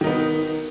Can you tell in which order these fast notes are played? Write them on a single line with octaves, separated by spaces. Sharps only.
D#3 D#4 B3